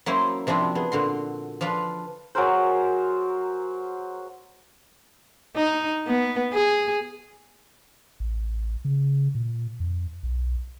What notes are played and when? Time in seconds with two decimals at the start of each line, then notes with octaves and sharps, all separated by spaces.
0.06 F#3 A#3 C#4 E4 C5
0.47 C3 F3 G3 D4 E4
0.75 B3 G#4
0.92 A#2 D3 F#4 C6
1.61 F3 D4 F4 B4
2.35 F#3 G#4 A#4 C5
5.55 D#4
6.07 B3
6.53 G#4
8.20 A1
8.85 C#3
9.35 A#2
9.80 F2
10.23 B1